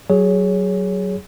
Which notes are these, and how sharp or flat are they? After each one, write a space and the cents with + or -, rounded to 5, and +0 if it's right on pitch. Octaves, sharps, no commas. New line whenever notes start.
F#3 +25 G#4 -5 C#5 +10